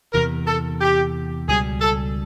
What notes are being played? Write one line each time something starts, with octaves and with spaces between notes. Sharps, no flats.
E2 C3 E3 A#4
A4
G4
C#2 B2 G3 G#4
A4